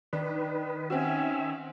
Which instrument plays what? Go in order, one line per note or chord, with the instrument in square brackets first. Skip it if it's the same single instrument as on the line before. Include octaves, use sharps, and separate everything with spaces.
[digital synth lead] D#3 [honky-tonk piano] D4 [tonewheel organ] B4
[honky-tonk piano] C4 F#4 [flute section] C#4 G5 G#5 [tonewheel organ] E5